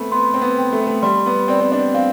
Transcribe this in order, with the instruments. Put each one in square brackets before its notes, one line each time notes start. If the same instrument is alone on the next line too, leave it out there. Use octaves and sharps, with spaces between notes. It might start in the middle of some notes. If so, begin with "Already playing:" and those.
Already playing: [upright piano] A3 B3 C4 [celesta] B5
[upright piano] B3 [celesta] C6
[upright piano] C4
B3
[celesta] G5
[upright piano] A3
B3
A3
[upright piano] G3 [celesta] C6
[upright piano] B3
[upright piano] C4 [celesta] D5
[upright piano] C4
D4
[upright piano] C4 [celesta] F5